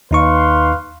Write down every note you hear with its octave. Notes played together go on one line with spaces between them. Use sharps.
D#2 D#4 B4 F5 C6 C#6